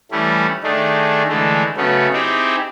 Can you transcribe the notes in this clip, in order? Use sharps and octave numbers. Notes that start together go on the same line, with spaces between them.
E3 G3 A3 C#4 E4
D#3 A3 D4 D#4 G#4
D3 E3 G#3 A3
C#3 F#3 A3 B3 C#4
C4 D#4 E4 G4 G#4